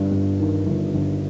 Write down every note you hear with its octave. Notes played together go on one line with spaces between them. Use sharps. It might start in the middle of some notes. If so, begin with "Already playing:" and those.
Already playing: G1 G2
G2
D#3
G1
G1